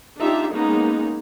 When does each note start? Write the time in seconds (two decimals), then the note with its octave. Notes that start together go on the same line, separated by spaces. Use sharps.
0.20 D4 D#4 F4 G4 E5
0.53 G#3 A#3 B3 C#4 D#4